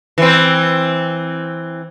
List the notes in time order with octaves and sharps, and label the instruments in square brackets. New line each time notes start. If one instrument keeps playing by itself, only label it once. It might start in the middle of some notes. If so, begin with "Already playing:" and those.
[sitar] E3 C4